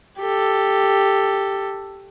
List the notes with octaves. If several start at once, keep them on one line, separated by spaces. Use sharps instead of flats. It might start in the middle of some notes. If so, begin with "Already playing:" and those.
G4 A4